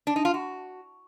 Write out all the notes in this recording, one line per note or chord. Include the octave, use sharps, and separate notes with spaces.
D4
D#4
F4
F#4